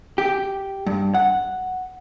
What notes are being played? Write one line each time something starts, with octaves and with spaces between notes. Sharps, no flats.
G4
G2
F#5